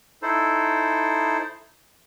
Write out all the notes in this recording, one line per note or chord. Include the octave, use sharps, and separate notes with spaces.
D#4 E4 A4 C5